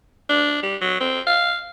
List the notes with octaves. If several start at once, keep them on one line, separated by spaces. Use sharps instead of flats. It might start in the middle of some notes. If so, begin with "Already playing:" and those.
D4
G3
F#3
C4
F5